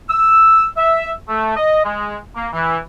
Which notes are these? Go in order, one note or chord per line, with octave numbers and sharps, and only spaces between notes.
E6
E5
A3
D#5
G#3
A#3
E3